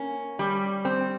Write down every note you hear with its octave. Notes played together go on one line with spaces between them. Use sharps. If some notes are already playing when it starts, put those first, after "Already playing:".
Already playing: A#3 C#4
G3
C4